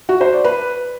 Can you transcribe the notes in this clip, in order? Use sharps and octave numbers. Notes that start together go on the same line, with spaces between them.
F#4
C5
D5
B4